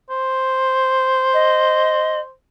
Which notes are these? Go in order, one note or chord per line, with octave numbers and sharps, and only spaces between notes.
C5
D#5